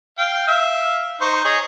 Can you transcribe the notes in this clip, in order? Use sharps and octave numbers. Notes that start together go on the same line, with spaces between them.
F5 G5
E5 F5
D#4 C5 C#6
G#4 C#5 D#5